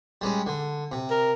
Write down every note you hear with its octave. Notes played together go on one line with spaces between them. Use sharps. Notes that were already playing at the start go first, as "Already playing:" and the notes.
G3 G#3 C#4
D3
C3
A#4